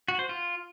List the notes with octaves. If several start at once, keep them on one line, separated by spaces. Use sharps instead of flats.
F#4
C5
F4